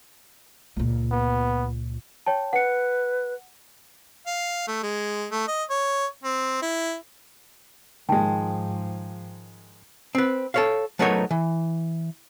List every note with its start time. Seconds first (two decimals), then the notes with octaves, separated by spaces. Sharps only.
0.76 C#2 A#2
1.11 B3
2.26 C#5 G5 A5
2.53 B4 F#5 C#7
4.27 F5
4.67 A3
4.83 G#3
5.31 A3
5.47 D#5
5.70 C#5
6.24 C4
6.62 E4
8.09 G#2 D#3 F3 G#3 G5 A5
10.15 C4 B4
10.54 A4 C#5 F5
10.99 F#3 A3 B3 D#4 A#4 C#5
11.31 E3